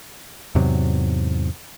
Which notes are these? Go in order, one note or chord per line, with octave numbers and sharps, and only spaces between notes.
E2 G#2 C3 F#3